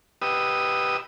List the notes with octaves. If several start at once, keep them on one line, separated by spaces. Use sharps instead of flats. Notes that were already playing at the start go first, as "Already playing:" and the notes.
G4 B4 D#5 D#6 E6